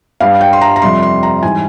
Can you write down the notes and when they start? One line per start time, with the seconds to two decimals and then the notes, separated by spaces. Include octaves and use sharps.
0.20 G2 G3 F5
0.41 G5
0.53 C6
0.61 A#5
0.76 A#5
0.82 F2 C3 G3 C6
1.03 C6
1.23 A#5
1.42 G#2 E3 G3 G#5